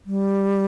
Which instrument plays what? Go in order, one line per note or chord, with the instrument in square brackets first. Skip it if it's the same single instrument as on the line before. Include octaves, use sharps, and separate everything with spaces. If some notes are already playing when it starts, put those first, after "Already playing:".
[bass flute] G3